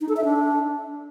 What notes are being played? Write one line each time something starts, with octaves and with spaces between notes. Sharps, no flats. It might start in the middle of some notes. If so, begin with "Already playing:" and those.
D#4
A4
E5
D4